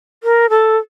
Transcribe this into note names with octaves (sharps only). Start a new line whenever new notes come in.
A#4
A4